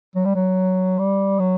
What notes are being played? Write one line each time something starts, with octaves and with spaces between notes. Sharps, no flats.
F#3
G3
F#3
G3
F#3